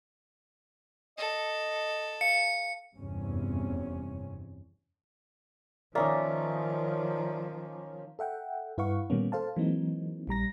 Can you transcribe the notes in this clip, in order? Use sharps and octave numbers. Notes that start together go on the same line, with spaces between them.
A4 D#5
F5 C#7
F1 E2 G2 C3 C#4
D#3 F3 A#3 C#4 D#4 D5 E5
A4 E5 F#5 G5
G2 E4 B4 F5 F#5 C#6
A#2 D#3 G3 A#3 B3 C#4
A4 C5 F5 A5
E3 F#3 G#3 A#3 C4 D#4
A#1 G3 A#5 A#6